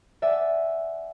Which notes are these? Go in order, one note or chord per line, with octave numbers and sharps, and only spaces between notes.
D5 E5 F#5 G#5